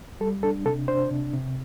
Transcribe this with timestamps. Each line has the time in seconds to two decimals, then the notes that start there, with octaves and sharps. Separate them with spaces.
0.21 G3 A4
0.43 D4 A4
0.65 C3 A4
0.88 D4 C5
1.11 C3
1.33 C3